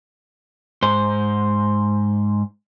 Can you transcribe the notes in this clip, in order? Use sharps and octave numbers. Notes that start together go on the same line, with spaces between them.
G#2 C5